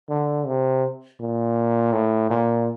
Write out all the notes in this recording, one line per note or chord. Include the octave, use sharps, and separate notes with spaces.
D3
C3
A#2
A2
A#2